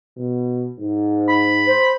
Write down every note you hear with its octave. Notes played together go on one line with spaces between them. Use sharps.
B2
G#2
B5
C5